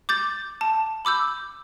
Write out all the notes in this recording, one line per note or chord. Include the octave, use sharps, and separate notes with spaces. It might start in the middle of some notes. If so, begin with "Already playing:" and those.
D6 G6 A6
A5
B5 D6 E6 G6